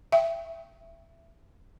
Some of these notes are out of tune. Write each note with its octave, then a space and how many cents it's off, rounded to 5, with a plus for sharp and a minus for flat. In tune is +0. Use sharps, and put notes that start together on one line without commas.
E5 +15 G5 +0